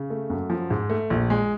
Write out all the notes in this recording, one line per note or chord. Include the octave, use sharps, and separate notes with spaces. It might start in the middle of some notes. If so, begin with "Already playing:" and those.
Already playing: C#3
A3
F#2
F3
G#2
A3
A#1
G#3